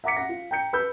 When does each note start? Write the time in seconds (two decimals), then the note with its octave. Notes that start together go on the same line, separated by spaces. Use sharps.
0.04 E5 F#5 A#5 D6 B6 C#7
0.16 F#5 A#6
0.29 F4
0.51 G5 A#5 G6 C#7
0.73 B4 B5 E6 G6